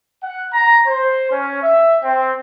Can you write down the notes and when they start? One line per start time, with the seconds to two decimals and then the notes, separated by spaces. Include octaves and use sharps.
0.22 F#5
0.52 A#5
0.86 C5
1.31 C#4
1.63 E5
2.03 C4